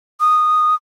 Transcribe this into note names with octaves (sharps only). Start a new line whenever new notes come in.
D#6